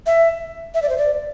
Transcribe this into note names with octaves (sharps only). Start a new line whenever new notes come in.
E5
E5
D5
C5
D5